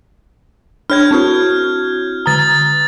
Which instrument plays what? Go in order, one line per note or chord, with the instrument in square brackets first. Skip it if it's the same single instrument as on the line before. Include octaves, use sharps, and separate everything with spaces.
[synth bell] D4 C#5 [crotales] F6 G6 G#6
[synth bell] C4 E4 F#4
[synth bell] D3 A#5 [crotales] D#6 A6